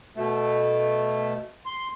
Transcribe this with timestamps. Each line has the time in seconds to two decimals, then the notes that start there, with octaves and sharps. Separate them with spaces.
0.16 B2 A3
1.66 C6